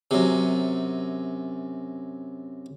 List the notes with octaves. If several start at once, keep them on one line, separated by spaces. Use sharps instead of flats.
F#2 C3